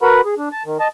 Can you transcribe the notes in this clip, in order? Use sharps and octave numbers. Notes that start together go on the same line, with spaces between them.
F#4 A#4 B4 F#5 B5
G#4
D4
A5
D#3
D#5 A5